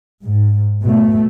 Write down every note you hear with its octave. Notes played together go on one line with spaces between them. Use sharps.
G#2
B2 A3